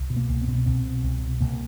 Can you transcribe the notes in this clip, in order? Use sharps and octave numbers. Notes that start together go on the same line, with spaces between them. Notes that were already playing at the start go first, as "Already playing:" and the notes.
Already playing: C2
B2
A#3
C2
B3
B2 C4
B3
C2 C4
B2
C2
B2
C2 A#3